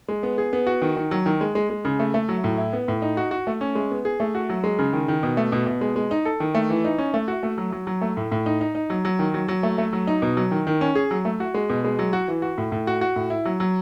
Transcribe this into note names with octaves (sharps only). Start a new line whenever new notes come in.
G#3
B3
G#4
B3
F#4
D#3
D#3
F#3
D#3
G#3
G#3
G#3
C#3
A3
A3
F#3
A2
E4
B3
A2
D#4
F#4
F#4
A3
C#4
G#3
B3
G#4
A3
F#4
F#3
G#3
C#3
D#3
D#3
B2
A3
B2
B2
G#3
G#3
D#4
A4
D#3
A3
E3
D#4
C#4
A3
F#4
A3
F#3
F#3
F#3
A3
A2
A2
D#4
D#4
D#4
F#3
F#3
D#3
F#3
F#3
A3
A3
F#3
D#4
B2
F#3
D#3
D#3
C#4
G#4
F#3
A3
F#4
G#3
B2
G#3
F#3
F#4
E3
F#4
A2
A2
F#4
F#4
A2
E4
F#3
F#3